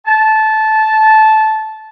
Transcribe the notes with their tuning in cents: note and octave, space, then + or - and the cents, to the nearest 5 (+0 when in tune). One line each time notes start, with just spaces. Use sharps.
A5 -15